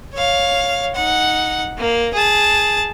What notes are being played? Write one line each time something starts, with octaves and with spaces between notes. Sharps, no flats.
C#5 F5
D#4 F#5
A#3
G#4 A5